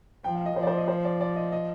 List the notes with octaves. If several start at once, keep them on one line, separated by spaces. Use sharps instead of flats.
F3 G5
F5
D#5
F3 C5
D5
C5
D#5
C5
D5
D5
D#5
D#5